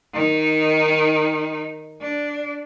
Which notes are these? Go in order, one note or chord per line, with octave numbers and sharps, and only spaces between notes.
D#3 D#4
D4